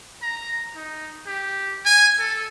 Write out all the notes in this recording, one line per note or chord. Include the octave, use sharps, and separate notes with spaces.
A#5
D#4
G4
G#5
A4